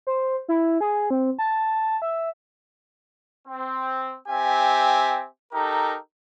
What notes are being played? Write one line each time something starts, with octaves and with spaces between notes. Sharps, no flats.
C5
E4
G#4
C4
A5
E5
C4
C4 G4 E5 G#5
D#4 G4 A4 A#4